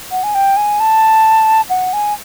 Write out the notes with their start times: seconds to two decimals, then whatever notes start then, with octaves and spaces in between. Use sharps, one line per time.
0.11 F#5
0.24 G#5
0.35 G5
0.57 G#5
0.80 A5
1.70 F#5
1.93 G#5